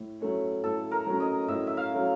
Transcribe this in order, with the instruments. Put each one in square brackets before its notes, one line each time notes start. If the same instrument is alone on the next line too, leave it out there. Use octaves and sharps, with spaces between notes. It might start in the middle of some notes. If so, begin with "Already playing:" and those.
Already playing: [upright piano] A2
F#3 A3 C#4
[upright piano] A2 [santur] A4
[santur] A#4
[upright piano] F#3 A3 C#4
[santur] D#5
[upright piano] A2 [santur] E5
[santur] E5
F5
[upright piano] F#3 A3 C#4